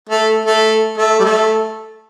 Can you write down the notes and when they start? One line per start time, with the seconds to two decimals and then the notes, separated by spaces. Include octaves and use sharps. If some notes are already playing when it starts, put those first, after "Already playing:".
0.09 A3
0.45 A3
0.98 A3
1.19 G3
1.24 A3